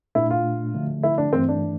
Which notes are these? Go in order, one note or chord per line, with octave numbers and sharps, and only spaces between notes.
A#2 A3 D4 E4
F4
D3 F3 A3
E4
D4
G2 E3 A3 C4
D4